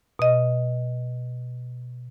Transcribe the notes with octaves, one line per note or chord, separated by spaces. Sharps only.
B2 D#5